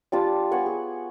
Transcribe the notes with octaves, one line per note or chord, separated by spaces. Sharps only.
G3 D4 F4 A5
B3 C#5 F#5 G#5
G#4